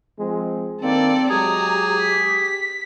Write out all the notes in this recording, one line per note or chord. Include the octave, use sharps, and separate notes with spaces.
F3 G#3 C4
G2 D#3 A#3 C4 A4 D5
F#3 G#3 G4 G#4 A#5
B6